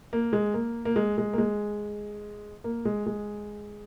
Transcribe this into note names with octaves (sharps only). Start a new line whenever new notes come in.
A#3
G#3
A#3
A#3
G#3
G#3
A#3
G#3
A#3
G#3
G#3